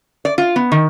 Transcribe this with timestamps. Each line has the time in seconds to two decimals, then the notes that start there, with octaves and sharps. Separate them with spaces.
0.25 D5
0.38 F4
0.56 B3
0.72 D#3